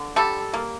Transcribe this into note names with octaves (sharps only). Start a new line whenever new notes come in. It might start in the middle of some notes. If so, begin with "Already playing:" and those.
Already playing: D3
G3 A4
A#3